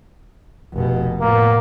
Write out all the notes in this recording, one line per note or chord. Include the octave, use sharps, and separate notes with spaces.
F1 B2
A2 A#3 B3